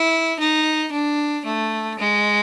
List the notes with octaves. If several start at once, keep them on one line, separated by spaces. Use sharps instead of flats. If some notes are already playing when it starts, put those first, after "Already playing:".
Already playing: E4
D#4
D4
A3
G#3